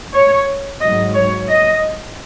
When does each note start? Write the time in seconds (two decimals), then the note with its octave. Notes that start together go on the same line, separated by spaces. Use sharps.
0.13 C#5
0.80 G#2 F#3 D#5
1.15 C#5
1.48 D#5